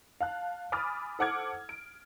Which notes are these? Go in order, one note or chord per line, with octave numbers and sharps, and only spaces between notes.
F5 A5 F#6
G#5 B5 D6 D#6 F6 A6
A4 C5 F#5 D6 F6 G#6
D7